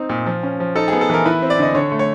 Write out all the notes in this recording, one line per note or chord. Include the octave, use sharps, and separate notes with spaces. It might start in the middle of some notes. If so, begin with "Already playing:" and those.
Already playing: C4 D#4
A#2
F3
C#4
F3
D#4 A4
B3 G#4
A4
E3 A#4
E4 B4
C4
D5
D3 D#5
D3 C#5
A3
C#5